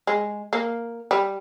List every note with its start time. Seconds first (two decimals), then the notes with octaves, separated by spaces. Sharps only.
0.07 G#3
0.53 A#3
1.11 G3